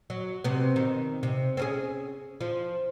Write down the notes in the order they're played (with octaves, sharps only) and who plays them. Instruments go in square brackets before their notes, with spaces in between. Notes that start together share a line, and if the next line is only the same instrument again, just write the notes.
[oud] F#3
C3 B3
D#3
C3
C4 C#4 G#4
F3